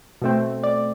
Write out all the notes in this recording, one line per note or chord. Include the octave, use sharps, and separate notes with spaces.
B2 A3 C4
D5